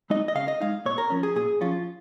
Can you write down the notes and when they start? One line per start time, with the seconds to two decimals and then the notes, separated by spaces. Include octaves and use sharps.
0.10 G#3 D#4 D#5
0.28 D#5
0.35 C#3 F5
0.48 D#5
0.60 G#3 D#4 F5
0.85 A#2 C#5
0.98 A#4
1.10 F3 C#4
1.23 G#4
1.36 A#2 G#4
1.61 F3 C#4 F4